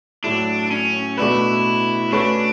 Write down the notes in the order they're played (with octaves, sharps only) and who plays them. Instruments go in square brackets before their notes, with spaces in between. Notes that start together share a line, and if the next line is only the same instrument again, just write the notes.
[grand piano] A2 F#3 A3 E4 [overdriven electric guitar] D4
[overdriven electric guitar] C#4
[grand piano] B2 A3 D4 F#4 B4 [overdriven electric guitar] E4
[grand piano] A3 C#4 F#4 B4 [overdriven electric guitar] D4